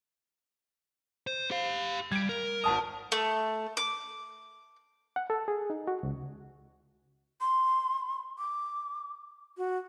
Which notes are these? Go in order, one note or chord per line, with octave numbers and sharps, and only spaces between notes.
C5
G4 F5
G3 G#6 D7
A#4
G#1 A5 D#6
A3
D6
F#5
A4
G#4
D#4
F#4
C#2
C6
D6
F#4